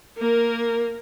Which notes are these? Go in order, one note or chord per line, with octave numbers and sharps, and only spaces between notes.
A#3 A#4